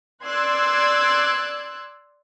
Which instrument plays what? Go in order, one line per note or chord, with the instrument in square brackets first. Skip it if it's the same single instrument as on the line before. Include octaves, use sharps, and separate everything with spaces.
[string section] D5 C6 E6 F#6 G#6